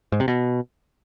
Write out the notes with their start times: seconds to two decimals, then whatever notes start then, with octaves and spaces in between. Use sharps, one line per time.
0.12 G#2
0.20 C3
0.28 B2